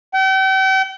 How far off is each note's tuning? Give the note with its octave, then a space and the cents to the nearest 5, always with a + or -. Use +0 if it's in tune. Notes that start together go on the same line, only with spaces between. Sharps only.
G5 -40